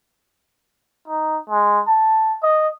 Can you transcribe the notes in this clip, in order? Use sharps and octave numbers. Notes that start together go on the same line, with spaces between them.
D#4
G#3
A5
D#5